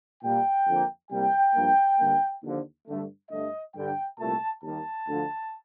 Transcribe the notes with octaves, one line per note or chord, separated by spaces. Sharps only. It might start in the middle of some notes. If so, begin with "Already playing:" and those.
A#2 G3 A#3 G5
F2 D3 F3 A#3
C2 C3 G3 A#3 G5
G2 F3 A#3
G2 D3 G3 A#3
D#2 D3 F3
G2 D3 A3
G2 D3 A3 D#5
G2 D3 G3 G5
C2 A#2 A3 A5
D#2 D#3 G3 A#3 A5
D2 D3 F3